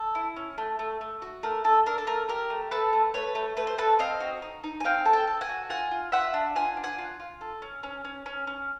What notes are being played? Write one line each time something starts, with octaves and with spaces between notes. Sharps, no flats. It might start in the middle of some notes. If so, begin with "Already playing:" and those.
Already playing: A4
E4
C#4
A3
A3
A3
F#4
A3 A#4
A3 A4
D4 A#4
A4
A3 A#4
G4 A#4
A3
A3 A4 B4
A3
A3 B4 C#5
A3
A3 B4
C5
A3 A4 B4
C4 D#5 F5
F#4
D#4
D#4
G#5
C4 F5 G5
A4
G5 A5
A4
F#5 G#5
F#4
F4 F#5 G#5
F4
F4 E5 F#5
D4
F4 F#5 G#5
D4
F#5 G#5
F4
F4
A4
C#4
C#4
C#4
C#4
C#4